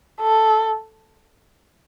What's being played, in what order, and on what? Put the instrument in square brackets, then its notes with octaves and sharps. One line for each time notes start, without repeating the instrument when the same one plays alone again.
[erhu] A4